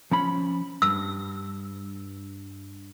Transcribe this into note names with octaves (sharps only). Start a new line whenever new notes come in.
F3 C#4 B5
G2 E6